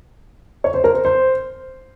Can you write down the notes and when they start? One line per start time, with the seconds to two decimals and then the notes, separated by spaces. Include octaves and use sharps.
0.64 C#5
0.74 C5
0.84 A#4
0.95 C5
1.05 C5